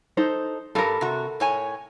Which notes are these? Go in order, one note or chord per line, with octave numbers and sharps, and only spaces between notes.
D#4 A4 C5
G2 G3 A4 A#4
C3 F#4
A2 C#5 G#5